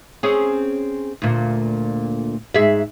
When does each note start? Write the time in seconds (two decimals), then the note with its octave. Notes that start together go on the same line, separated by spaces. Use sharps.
0.23 C4 C#4 G#4
1.22 D2 A#2
2.54 G#2 G#4 E5